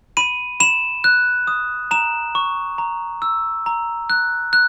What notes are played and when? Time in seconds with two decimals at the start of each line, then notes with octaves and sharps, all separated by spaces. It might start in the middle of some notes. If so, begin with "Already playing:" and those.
0.17 B5 D#7
0.60 B5 E7
1.04 F#6
1.47 D#6
1.91 A#5 E7
2.35 C#6
2.78 A#5
3.22 E6
3.66 A#5
4.10 F#6
4.53 F#6